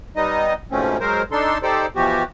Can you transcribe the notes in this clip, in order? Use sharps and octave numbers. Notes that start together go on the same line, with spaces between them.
G3 B3 D#4 D#5
G#2 B2 F3 A3 C4 C#4
F#3 G#3 A#4 C5
D4 D#4 A4 C6
D#4 G4 A4 C5 D5
B2 E3 F3 B3 F#4 G4